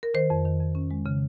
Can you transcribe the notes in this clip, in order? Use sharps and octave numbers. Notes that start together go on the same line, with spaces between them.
A#4
D#3 C5
F2
D#3
F2
C#4
G#3
C#3